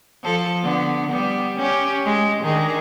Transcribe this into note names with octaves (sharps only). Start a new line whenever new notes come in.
F3 A4
D3 B3
G3 B3
C#4 G4
G#3
D#3 D4 G#4